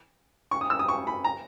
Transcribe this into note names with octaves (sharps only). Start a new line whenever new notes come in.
C#6
D#6
E6
D#6
C#6
B5
A#5